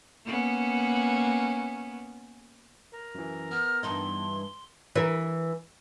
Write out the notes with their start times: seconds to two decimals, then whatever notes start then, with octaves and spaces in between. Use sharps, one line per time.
0.25 A#3 B3 C#4
2.93 A#4
3.15 F#2 E3
3.51 B3 F6
3.83 G2 E3 D#4 C6
4.96 E3 A#4